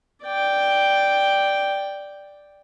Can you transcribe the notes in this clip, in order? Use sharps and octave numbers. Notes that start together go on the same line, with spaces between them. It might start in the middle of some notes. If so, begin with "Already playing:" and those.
D5 G5